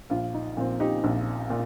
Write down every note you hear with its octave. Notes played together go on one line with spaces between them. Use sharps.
A#1 F4
D#4
A#2 F3 C4
D#4 G4
A#1
A#2